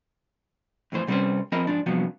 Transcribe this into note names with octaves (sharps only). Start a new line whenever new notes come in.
F2 A2 E3 C5 C6
C3 G3 C4 C#4 B4 C5
F3 C4 A#4 D#5 B5
G#2 F3 D4
G2 C3 F3 F#3 B3